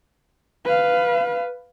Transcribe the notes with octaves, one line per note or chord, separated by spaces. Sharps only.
B4 F5